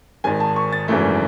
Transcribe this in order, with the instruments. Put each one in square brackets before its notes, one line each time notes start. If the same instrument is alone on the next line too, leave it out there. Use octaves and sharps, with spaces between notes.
[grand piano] G#1 G#2 D#3 G#5
A5
C#6
A6
G#1 F#2 C#3 E3 A3